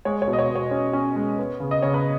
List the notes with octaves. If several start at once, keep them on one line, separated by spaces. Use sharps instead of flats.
G#3 C#5
C#5
B2
D#5
C#5
B2
C#5
C#4
C#4
G#3
B3
C#3
D#5
C#3 C#5
B4